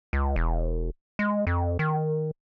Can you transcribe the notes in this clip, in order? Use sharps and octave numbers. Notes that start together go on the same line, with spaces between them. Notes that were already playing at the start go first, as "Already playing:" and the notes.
C#2
E1
G#3
F2
D#3